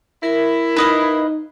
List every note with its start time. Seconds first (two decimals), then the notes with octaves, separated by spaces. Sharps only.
0.23 E4 A#4
0.76 D#4 B4 D#5 F5